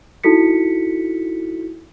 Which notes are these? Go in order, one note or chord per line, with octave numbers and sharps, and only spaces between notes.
D#4 E4 F#4 A4 B6 C#7